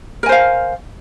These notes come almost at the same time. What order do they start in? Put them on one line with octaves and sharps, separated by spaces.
A#4 G#5 C5 F5